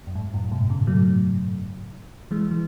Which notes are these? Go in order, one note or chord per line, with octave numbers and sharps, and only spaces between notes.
F#2
G#2
F#2 A2
G#2 B2
A2 C#3
F#3 A3
E3 G#3
E3